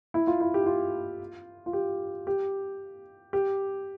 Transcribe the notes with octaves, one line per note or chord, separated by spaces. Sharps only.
E4
F4
E4
G4
F4
F4
G4
G4
G4